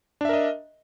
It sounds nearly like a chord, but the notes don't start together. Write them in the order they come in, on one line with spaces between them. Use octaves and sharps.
D4 E5 A#4 D#5